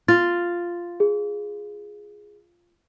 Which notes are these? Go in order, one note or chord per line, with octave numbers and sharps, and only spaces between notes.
F4 A6
G#4